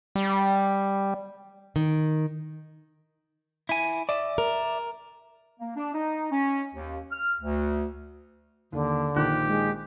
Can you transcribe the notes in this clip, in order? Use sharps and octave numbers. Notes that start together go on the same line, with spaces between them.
G3
D#3
E4 G#5
D5 E5
A#4
A#3
D4
D#4
C#4
D#2
F6
D2
D#2 D3
A#1 D#3 G4 F#6
G#3